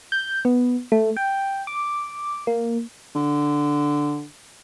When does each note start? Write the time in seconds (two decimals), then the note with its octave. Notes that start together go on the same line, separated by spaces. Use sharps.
0.12 G6
0.45 B3
0.92 A3
1.17 G5
1.67 D6
2.47 A#3
3.15 D3